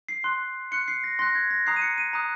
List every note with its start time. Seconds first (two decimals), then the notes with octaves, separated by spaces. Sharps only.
0.09 C7
0.24 C6 F#6
0.72 C6 F#6 C#7
0.88 C7
1.04 A#6
1.19 C6 F#6 A#6
1.35 G#6
1.50 A#6
1.66 A#5 D#6 F#6 C7
1.76 D#7
1.82 C#7
1.98 D#7
2.13 A#5 D#6 F#6